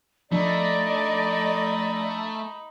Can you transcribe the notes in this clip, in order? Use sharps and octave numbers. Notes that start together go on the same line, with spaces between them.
F3 A3 D4 D#4 D5 D#5 B5